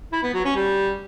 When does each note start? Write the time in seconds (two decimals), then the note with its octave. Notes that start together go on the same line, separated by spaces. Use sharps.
0.13 E4
0.23 B3
0.34 F#3
0.45 C#4
0.56 G3